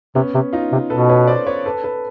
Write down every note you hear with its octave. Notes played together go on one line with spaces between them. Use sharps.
C3 B3 C#4
C3
D#4 F4
C3
B2 A4 B4
B4 C#5
C5 D5
B4 C#5
A4 B4
A4 B4